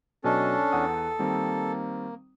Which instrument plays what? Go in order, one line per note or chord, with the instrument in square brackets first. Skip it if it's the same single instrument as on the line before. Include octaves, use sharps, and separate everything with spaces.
[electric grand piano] B2 F#3 D#5 [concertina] C#4 D4 [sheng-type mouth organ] A4
[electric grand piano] E2 F#5 D#6
[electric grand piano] D#3 G3 C4 [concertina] A#3